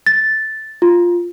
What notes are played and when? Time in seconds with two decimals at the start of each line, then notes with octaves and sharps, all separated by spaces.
0.06 A6
0.82 F4